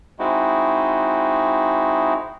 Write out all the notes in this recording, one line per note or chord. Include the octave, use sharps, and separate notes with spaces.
G#3 C4 D#4 E4 F#4